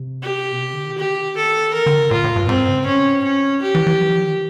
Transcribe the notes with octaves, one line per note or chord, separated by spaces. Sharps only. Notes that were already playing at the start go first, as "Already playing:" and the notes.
Already playing: C3
G4
B2
C3
D3
D#3
G4
A4
E3 A#4
D3
C#3
A2 F4
A2
G2
G#2 C4
C#3
C#4
C#4
G4
E3
E3
F#3
E3
F3
D#3